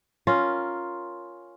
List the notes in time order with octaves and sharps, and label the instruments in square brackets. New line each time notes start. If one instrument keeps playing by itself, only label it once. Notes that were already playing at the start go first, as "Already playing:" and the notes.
[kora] C#4 F4 A#4